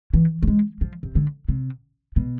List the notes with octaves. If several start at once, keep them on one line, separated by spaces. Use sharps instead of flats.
E3
A3
G#3
F3
C3
D3
C3
B2